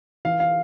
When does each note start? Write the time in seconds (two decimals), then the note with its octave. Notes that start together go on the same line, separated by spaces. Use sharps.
0.25 E3 F5
0.40 F5